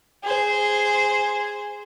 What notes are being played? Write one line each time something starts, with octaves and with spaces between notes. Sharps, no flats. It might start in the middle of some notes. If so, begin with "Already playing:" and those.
G#4 C5